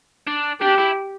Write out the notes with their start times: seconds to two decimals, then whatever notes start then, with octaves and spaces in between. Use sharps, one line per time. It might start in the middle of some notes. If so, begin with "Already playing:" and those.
0.27 D4
0.61 D4 G4
0.78 E4